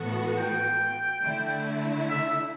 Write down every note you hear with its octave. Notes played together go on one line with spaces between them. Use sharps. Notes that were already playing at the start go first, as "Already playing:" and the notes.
Already playing: A2 E3 B3 F#4 A4
G5
D3 A3 E4
E5